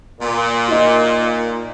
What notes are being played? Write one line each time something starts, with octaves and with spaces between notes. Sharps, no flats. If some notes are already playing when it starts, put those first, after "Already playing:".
A#2
D#4 F4